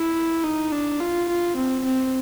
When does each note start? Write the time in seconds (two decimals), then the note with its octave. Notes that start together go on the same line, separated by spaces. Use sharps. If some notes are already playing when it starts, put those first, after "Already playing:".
Already playing: E4
0.44 D#4
0.72 D4
1.00 F4
1.28 F4
1.56 C4
1.84 C4